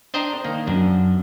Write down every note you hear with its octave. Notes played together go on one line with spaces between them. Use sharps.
D4 C5 D#5 G5 A#5
D#3 A#3
F#2 D4